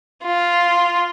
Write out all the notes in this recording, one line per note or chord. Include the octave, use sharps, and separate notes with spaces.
F4